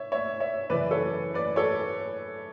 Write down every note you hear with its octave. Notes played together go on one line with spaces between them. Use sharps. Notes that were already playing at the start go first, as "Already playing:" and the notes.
Already playing: C#5 E5
C#5 E5
C#5 E5
F#2 C#3 E3 B4 D5
A4 C#5
B4 D5
A4 C#5